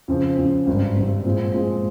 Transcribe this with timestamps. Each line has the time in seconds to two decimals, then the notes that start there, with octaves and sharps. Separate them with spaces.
0.08 F2 C#3 F3 C4
0.38 F2 C#3 F3 C4
0.67 G#1 G2 G3 C4
0.96 G#1 G2 G3 C4
1.25 A#2 F3 G#3 C4
1.54 A#2 F3 G#3 C4